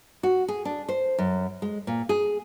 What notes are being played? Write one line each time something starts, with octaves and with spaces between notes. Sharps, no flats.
F#4
G#4
D4
C5
F#2
G#3
A#2
G#4